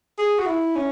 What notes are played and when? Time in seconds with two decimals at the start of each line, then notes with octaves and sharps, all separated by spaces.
0.18 G#4
0.38 F#4
0.46 E4
0.76 C#4